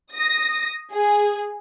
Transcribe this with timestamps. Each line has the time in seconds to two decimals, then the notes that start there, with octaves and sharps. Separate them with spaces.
0.14 D#6 A#6
0.93 G#4